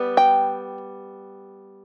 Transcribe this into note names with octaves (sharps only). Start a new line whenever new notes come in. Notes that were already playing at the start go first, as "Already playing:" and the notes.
Already playing: G3 B3
G5